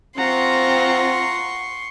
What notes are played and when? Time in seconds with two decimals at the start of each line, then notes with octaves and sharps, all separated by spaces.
0.17 C4 F4 F#5 A#5 C6 C#6